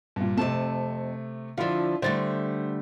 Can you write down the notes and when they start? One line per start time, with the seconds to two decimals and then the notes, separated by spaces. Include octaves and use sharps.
0.16 G2 A#2
0.37 F2 C3 A3 A5
1.57 D3 F3 D4 E4 F4
2.02 D3 G3 A3 C5 A6